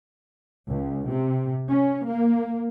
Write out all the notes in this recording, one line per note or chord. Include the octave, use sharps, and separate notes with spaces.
C#2
C3
C#4
A#3